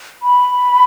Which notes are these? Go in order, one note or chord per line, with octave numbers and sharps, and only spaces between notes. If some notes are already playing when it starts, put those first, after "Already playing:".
B5